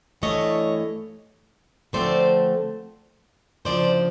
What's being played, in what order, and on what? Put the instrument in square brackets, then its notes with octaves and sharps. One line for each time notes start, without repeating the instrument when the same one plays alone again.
[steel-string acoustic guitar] G2 E3 A3 C#5 D#5
D3 F3 A3 C4 C5 D5
D2 C#3 F3 C5 D5